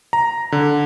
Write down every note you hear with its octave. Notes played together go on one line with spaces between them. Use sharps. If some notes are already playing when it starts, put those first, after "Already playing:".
A#5
D3